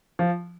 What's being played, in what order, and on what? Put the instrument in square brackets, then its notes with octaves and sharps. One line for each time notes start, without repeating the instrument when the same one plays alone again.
[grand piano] F3